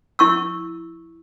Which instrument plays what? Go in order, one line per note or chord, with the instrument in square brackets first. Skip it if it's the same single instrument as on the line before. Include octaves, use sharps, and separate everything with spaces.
[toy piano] E4 C#6 E6